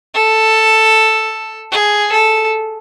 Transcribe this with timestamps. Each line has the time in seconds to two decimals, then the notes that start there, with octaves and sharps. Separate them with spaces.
0.14 A4
1.72 G#4
2.12 A4